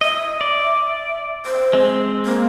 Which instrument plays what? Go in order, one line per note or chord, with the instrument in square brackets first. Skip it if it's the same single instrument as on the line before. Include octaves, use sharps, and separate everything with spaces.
[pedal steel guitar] D#5 [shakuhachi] E5
[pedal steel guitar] D5
[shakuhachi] C5
[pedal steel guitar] G#3 C4
[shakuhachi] A#3